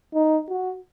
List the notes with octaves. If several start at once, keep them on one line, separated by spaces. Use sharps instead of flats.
D#4
F#4